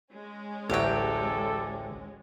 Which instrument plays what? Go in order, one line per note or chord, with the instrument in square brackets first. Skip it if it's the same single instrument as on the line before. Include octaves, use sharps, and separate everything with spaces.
[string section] G#3 C#4
[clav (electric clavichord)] A1 D2 F#3 [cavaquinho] G4 G5 [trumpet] A4